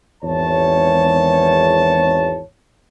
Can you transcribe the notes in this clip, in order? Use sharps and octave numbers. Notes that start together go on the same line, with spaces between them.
G#1 E2 C#5 A5